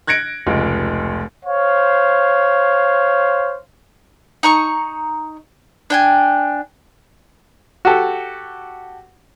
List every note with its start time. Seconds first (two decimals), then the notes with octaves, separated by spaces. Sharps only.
0.07 F#6 G#6 A#6 C#7 D7
0.47 F1 C#2
1.45 C5 C#5 F5
4.43 D#4 A#5 C#6
5.90 D4 G5 G#5
7.85 F#4 G4 A4